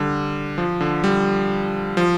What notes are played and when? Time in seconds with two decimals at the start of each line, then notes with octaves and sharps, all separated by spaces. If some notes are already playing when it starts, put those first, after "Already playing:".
Already playing: D3 G3
0.58 F3
0.81 D3
1.04 G3
1.97 F3